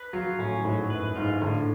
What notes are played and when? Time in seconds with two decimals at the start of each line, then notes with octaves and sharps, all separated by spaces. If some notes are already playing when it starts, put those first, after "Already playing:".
Already playing: B4
0.13 F#3 F4
0.39 A2 C#4
0.60 G#2
0.64 A2 F#3
0.90 F#2 B4
1.16 G#2 F4
1.41 A2 D3